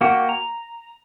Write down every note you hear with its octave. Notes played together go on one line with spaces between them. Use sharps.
A#3 F#4 G4
A#5